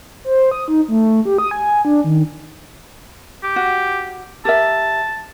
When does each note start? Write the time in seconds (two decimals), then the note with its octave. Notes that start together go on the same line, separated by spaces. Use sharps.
0.24 C5
0.51 D#6
0.68 D#4
0.88 A3
1.25 G4
1.39 D#6
1.51 G#5
1.85 D4
2.04 D#3
3.43 G4
3.56 F#4
4.45 G4 A#4 E5 A5